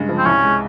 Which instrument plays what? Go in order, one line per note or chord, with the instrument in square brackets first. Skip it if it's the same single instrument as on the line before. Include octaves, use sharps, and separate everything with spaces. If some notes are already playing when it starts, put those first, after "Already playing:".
Already playing: [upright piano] G2 C#3 G#3
F3
[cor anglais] C4
[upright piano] C2 [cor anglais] C#4
[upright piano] G#3